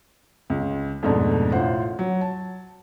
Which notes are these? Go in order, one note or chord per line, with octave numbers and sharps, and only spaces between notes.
C#2
F2 G#2 B2 A3 D4
A1 F4 C5 F#5
F#3
A5